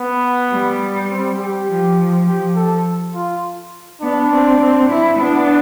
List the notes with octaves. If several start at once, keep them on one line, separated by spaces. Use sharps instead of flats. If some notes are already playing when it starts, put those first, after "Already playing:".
Already playing: B3
G3
C4
G4
F3
F3
F3 G4
A4
F4
B3 D4
C4
C4
E4
B3 D4